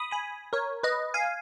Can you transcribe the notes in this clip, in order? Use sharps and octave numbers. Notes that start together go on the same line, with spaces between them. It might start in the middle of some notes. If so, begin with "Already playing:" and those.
Already playing: B5 D#6
G#5 B5
A#4 C#5
B4 D#5
F5 G#5